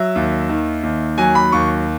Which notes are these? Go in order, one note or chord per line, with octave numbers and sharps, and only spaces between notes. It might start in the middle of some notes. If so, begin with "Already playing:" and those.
Already playing: F#3 E5
D#2
D#3
D#2
F#3 G#5
B5
D#2 C#6